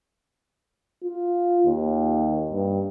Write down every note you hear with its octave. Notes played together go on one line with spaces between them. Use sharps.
F4
D#2
G2